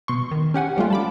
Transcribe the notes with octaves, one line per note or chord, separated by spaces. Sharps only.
B2 C6 C#6
D#3
C#4 G4 F#5 G#5
F3 G3 A3 F4
A5 B5 D6